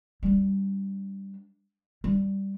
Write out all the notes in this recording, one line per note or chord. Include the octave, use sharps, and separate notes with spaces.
G3 D4
G3